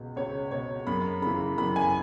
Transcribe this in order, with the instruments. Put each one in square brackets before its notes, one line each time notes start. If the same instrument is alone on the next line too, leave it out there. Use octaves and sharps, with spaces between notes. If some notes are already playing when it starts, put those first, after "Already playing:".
Already playing: [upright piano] C#2 B2
C#2 C#5
B2 C#5
F#2 B5
C#3 E3 B5
F#2 B5
G#5